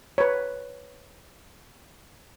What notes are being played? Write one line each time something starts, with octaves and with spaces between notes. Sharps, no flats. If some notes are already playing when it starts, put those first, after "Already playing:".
B4 C#5